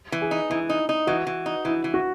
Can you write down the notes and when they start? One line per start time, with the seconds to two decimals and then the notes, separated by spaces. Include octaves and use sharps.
0.12 E3
0.22 G#4
0.31 D#4
0.50 E3 E4
0.69 D#4
0.89 D#4
1.07 E3 F#4
1.27 E3
1.46 D#4
1.65 E3 E4
1.84 E3
1.94 F#4